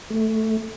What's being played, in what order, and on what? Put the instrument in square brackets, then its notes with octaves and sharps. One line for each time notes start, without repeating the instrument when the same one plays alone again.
[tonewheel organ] A3